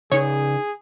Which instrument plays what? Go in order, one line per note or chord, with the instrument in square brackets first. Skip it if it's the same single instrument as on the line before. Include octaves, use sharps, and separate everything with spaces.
[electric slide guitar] C#3 D#4 [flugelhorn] G#4 [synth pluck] C#5